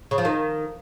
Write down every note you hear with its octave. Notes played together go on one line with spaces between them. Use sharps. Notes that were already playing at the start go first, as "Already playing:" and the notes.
C#3
F3
D#3